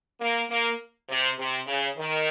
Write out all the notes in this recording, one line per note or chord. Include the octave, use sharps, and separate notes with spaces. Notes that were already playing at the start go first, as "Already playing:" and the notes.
A#3
A#3
C3
C3
C#3
D#3